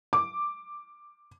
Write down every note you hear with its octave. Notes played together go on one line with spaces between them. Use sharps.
D6